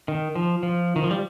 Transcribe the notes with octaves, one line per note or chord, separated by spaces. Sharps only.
D#3
F3
F3
D#3
F3
G3